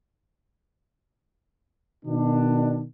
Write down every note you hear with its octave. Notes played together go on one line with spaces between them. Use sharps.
B2 D#3 D4